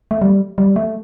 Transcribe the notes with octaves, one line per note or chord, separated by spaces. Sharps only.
A3
G3
G3
A3